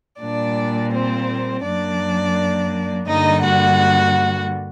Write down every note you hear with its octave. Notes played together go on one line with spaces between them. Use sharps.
A#2 G3 A#3 D4 D5
C4 C5
F#2 F#3 A#3 D4 D5
G2 D3 G3 A#3 D#4 D#5
F#4 F#5